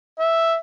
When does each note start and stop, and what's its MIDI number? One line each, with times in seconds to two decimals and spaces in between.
0.19 0.56 76